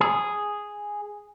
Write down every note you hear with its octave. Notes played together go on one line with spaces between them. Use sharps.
G#4